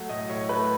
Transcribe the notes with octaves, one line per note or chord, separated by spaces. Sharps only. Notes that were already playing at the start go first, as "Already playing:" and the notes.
Already playing: F#3 A3 F#5
A2 D#5
A2 C#5
A3 B4